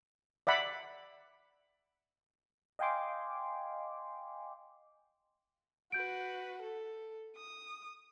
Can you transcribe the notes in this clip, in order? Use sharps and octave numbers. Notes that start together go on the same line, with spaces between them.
D5 E5 F#5 B5
D#5 F5 G5 G#5 C6 D6
F#4 B4 G6 D7
A4
D#6